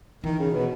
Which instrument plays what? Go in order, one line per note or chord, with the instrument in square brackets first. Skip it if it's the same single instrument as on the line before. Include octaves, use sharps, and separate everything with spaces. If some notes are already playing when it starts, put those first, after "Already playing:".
[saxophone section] D#3 [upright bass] E3
[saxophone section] C#3
B2